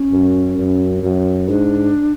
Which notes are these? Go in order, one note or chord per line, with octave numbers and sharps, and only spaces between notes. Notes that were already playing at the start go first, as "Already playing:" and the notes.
Already playing: C#4
F#2
F#2
F#2
G#2 D4